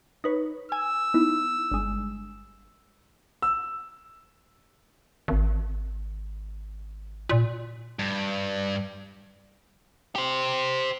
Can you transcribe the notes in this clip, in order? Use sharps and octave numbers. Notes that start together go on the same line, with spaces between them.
D#4 B4 C#5
G#5 E6
B3 D#4 E4
G1 G#3
E6
G#1
A#2
G2
G4 C5